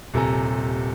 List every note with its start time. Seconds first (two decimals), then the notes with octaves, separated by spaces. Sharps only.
0.14 D#1 C3 A4 G#5 A#5